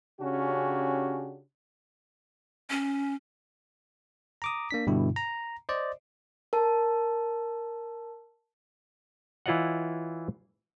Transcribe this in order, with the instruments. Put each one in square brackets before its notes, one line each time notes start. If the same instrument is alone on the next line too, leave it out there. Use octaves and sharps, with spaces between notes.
[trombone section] C#3 C#4 D4 F#4 G4
[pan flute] C#4
[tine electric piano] A#5 D6 D#6
A#3 D4 B6
G2 B2 D3 E4
A#5
C5 D5 D#5
[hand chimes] A#4 A5
[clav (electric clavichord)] E3 E4 F4 C#5 D#5 F#5